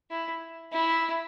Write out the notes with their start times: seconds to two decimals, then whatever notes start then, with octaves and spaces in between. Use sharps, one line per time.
0.11 E4
0.73 E4